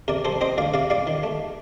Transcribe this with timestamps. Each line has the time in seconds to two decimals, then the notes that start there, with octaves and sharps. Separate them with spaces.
0.08 C3 A#4 D5
0.25 G3 A4 C5
0.41 C4 C5 D#5
0.58 D2 D5 F5
0.74 C3 D5 F5
0.90 G3 D5 F5
1.07 D#3
1.23 A3